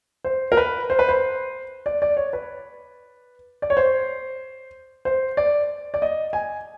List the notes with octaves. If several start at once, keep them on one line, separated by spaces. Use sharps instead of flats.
C5
A#4
B4
C5
B4
C5
D5
D5
C#5
B4
D5
C#5
C5
C5
D5
D5
D#5
G#5